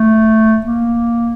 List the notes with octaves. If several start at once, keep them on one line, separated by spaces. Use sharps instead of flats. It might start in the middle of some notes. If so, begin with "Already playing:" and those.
Already playing: A3
A#3